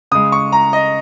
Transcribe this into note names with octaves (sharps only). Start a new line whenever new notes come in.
C#3 G#3 D#6
C#6
A#5
D#5